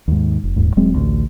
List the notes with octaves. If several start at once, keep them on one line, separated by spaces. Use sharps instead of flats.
D#2 G#2
F1
D#1 D#2 G#2
D#1 F#3 G#3 C4
A1 D2